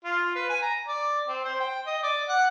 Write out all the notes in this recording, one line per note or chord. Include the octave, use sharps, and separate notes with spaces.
F4
B4
G#5
A#5
D5
C4
C5
G5
D#5
D5
F#5